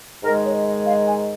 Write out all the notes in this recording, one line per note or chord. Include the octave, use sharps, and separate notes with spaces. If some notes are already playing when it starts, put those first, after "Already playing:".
G#2 D#3 G#3 A#4
C#5
D#5
F5
G#5